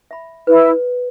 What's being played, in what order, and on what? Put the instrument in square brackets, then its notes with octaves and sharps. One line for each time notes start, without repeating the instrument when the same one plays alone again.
[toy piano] E5 B5
[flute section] E4 [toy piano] B4